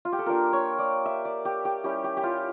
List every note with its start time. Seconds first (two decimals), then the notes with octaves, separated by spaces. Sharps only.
0.05 F4
0.12 G4
0.19 A4
0.26 A#3 D4 F4 A#4
0.53 C#5
0.79 D5
1.06 E5
1.25 D5
1.45 G4
1.65 G4
1.84 G3 C#4 E4 G4
2.04 G4
2.17 G4
2.23 F4